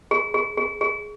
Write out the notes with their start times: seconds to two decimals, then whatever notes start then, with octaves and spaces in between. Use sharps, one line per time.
0.11 G#4
0.34 G#4
0.57 G#4
0.81 G#4